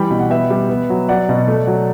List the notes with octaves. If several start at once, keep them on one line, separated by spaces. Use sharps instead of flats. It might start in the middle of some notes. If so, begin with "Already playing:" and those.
Already playing: E3 G3 G5 B5
B2
F#5
B3 E5 G5
G3
B3
F#3
F#3 D5 F#5
B2
A3
F#3